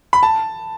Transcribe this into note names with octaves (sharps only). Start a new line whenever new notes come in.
B5
A5